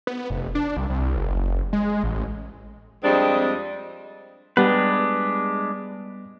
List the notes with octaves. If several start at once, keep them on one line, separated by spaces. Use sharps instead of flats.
B3
F1
D4
C2
C2
F#1
G#3
A1
F2 G3 G#3 C4 D4 D#5
G3 G#3 B3 D4 B4